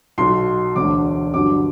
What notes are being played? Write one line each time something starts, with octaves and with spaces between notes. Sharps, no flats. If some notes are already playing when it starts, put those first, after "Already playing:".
B1 B2 F#3 C6
E1 D2 D3 D6
G1 G2 D3 F#3 D6